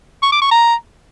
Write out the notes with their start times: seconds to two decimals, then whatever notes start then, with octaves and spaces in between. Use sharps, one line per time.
0.22 C#6
0.32 D6
0.41 C#6
0.51 A#5